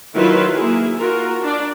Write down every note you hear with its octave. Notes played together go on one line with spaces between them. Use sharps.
D#3 F#3 E4 F4 B4 C6
A#3 E4 G#4
F4 F#4 A#4
D4 D5